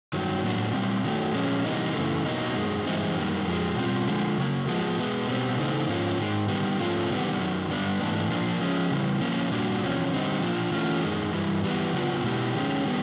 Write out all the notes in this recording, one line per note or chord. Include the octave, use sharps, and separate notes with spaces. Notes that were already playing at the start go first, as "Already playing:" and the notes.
G2 D#3 F#3
A2 F#3 A#3 D4
A#2 G3 C4
D#3 F#3 A3
A#2 F3 G#3 C#4
C3 E3 G3 A#3 D#4
F#2 C#3 E3 A3
B2 F#3 A#3 D#4
F#2 D#3 G#3
G2 E3 G#3 C4 D#4
F#2 D#3 G3 A#3
F2 D3 F3 G#3
B2 G3 C4 F4
D3 F3 G#3
C#3 F#3 A#3
F3 G#3 B3
B2 G#3 B3
B2 G3 C4
C#3 E3 A3 C4 D#4
G#2 F3 A#3 C#4 F4
G#2 D#3 G#3
D#3 G3 B3
G#2 F3 A3 C#4 F4
E2 C3 D#3 G3 B3
F#2 D#3 F#3
G2 D3 G3 B3 D4
G#2 E3 A3 D4
A#2 F3 A#3 D4 F4
F3 G#3 C#4
C#3 E3 G3
F3 A#3 C#4
A#2 G3 A#3 D4 F#4
E2 C3 F3 C#4
D3 G3 C4 D#4
A#2 F3 A#3 D4 F4
E3 A3 C#4 F4
F#2 D#3 G#3
G2 E3 G3
E3 G3 B3
C#3 F#3 B3 D4 F4
B2 G#3 B3 E4 G4
D#3 G#3 C#4
D#3 G3 B3